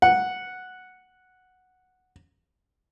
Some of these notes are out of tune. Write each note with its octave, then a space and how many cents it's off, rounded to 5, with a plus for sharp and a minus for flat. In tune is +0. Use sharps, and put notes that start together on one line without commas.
F#5 -5